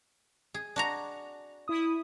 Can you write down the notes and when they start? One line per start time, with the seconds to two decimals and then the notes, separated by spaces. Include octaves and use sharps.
0.54 G#4
0.76 D4 F#4 A#5
1.68 E4 D#6